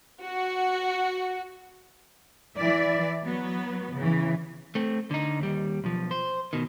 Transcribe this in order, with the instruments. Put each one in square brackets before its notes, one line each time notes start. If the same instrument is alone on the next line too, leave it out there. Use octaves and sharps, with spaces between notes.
[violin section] F#4
[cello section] E3 D5 E5
F#3 B3
C#3 E3
[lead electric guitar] A3 C4
D3 D#4
D#2 G3
B1 F3
C5
B2 D#3